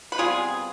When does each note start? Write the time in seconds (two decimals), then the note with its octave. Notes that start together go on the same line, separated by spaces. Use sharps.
0.12 B4
0.18 C3 G3 B3 F4 G#4